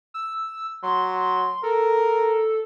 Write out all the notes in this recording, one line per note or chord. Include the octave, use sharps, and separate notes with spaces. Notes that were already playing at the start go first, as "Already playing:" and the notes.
E6
F#3 C6
A4 A#4